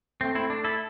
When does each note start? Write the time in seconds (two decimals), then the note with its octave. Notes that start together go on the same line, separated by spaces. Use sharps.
0.21 A3 C4
0.35 C4 E4
0.50 D4
0.64 E4 A4